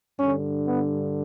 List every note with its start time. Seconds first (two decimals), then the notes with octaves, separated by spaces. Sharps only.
0.20 G2 D3 C#4
0.67 B3